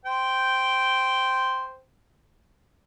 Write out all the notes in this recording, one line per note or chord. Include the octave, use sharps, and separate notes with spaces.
C5 G5